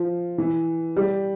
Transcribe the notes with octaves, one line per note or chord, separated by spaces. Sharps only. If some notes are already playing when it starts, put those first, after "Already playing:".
Already playing: F3
E3
G3